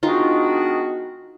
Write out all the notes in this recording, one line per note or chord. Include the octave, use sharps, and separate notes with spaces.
D#3 G#3 B3 D4 D#4 F4 F#4